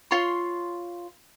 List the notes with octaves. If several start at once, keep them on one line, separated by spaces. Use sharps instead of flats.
F4 C#5 C6